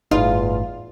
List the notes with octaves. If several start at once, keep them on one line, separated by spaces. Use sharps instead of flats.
G1 E2 A2 D#4 F4